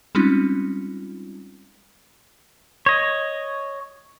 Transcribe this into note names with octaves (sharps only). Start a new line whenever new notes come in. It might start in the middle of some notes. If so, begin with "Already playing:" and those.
G3 G#3 C4 C#4 D#4 F4
C#5 D#5